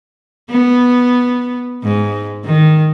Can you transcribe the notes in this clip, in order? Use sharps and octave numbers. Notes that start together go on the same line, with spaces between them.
B3
G#2
D#3